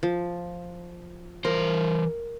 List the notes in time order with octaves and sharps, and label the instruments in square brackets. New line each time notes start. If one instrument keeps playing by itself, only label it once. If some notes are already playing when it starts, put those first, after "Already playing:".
[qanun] F3
[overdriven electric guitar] E3 C5 [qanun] A#4